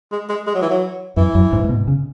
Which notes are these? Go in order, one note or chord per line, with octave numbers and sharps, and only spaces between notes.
G#3
G#3
G#3
F#3
E3
F#3
F#2 E3
F#2
G#2
G#2
B2
C#3